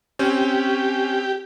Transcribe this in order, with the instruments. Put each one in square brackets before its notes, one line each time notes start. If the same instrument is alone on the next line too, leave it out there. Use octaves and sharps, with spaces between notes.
[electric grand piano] C4 C#4 [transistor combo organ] G4